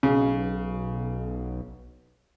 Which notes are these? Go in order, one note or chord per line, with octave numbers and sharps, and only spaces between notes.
B1 C#3